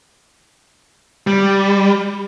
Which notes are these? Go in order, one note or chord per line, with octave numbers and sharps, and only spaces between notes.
G3